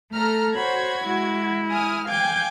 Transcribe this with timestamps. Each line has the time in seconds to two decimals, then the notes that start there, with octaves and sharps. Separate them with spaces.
0.12 A3 A4 A#5 F6
0.55 F#4 C5 C#5 B5 G#6
1.03 G#3 E4
1.72 G#5 D#6 F6
2.08 F5 G5 G#5 D6 G6